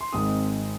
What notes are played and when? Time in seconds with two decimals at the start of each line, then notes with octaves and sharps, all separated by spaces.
0.01 C6
0.13 G#1 G#2 G#3 C4 D#6